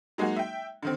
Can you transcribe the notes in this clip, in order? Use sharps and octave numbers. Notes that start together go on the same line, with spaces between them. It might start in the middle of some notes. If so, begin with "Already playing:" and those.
F#3 G#3 A#3 D#4 F#4
E5 G5
D3 D#3 C4